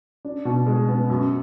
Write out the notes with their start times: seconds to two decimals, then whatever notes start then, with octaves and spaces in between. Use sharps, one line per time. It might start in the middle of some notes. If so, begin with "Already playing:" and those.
0.25 D4
0.45 B2
0.67 G#3
0.89 B3
1.10 F#2